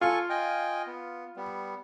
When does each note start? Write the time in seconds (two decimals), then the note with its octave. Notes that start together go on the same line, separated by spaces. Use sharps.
0.01 F4 A4 G#5 C#6
0.29 D#5 G5 G#5
0.87 B3
1.36 G3 B3